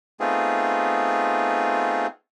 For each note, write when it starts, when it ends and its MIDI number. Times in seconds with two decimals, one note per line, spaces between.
0.20 2.07 57
0.20 2.07 59
0.20 2.07 60
0.20 2.07 63
0.20 2.07 65
0.20 2.07 68